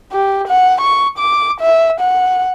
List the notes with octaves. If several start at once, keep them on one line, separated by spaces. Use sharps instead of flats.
G4
F#5
C#6
D6
E5
F#5